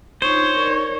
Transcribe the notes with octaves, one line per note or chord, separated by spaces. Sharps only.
D4 D#4 F4 C5 C#5
D#4 A#4 D5